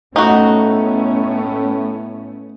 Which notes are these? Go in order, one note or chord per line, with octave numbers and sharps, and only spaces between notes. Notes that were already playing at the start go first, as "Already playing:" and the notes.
A2 A3 B3 C#4 D#4 F#4